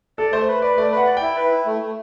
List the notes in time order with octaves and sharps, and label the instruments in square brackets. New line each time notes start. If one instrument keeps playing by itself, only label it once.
[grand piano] A4 [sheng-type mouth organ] D5
[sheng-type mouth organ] A3 [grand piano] C5
[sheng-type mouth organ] B4
[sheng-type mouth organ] B4 [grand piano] D5
[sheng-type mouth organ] A3 [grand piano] D5
[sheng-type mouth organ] B4 [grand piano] F#5
[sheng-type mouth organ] D5
[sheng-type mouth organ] E4 [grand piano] G5
[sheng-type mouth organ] B4
E4
A3
A3